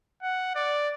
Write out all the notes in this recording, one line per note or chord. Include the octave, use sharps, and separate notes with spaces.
F#5
D5